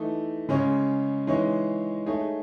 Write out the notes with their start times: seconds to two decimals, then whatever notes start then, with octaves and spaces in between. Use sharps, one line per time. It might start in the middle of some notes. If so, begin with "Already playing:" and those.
Already playing: E3 A3 D#4
0.49 C#3 G#3 C#4 G#4 C#5
1.27 E3 G#3 D#4 G#4 C#5
2.06 A3 D#4 G#4 C#5